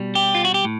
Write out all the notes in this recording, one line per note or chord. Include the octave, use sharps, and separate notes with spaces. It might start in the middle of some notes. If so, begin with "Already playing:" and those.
Already playing: B2 G3
G4
F4
F#4
G4
A2